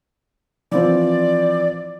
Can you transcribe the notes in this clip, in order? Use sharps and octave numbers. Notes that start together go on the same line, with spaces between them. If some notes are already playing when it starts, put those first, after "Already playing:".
E3 F3 C4 D5